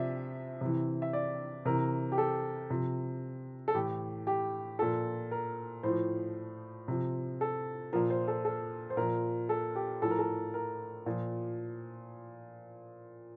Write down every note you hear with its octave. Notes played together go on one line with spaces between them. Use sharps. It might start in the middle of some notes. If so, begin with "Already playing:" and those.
Already playing: C3 F3 D5 E5
C3 E3
E5
D5
C3 E3 A#4
G4
A4
C3 F3
A4
A2 E3 G4
G4
A#2 F3 A4
A#4
A2 F3 C5
C3 F3
A4
A#2 F3 A#4
C5
A4
A4
C5
A#2 F3 A#4
A4
G4
A2 F3 A4
A#4
A4
A#4
A#2 F3